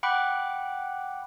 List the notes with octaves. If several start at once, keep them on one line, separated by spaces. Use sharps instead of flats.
F#5 G5 B5 D6 F#6